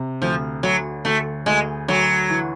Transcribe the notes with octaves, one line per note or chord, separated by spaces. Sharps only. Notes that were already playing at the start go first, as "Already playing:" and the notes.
Already playing: C3
D2 F3
D2 F#3
D2 A3
D2 G#3
D2 F#3
E3